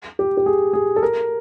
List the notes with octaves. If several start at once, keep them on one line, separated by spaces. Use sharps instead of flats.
G4
G4
G#4
G#4
A4
A#4